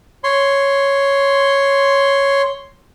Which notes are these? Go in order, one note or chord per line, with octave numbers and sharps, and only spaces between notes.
C#5 C6